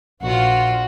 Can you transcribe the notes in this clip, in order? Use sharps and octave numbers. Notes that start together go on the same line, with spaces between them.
A#1 F4 F#4